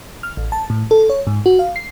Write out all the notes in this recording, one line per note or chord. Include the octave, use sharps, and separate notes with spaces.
F6
A1
A5
A2
A4
C#5
G#2
F#4
F5
C7